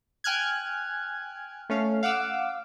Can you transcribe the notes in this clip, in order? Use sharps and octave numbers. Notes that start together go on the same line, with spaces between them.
G5 G#5 F6 F#6 G#6
A3 C#4 F5
F5 F#5 D6 E6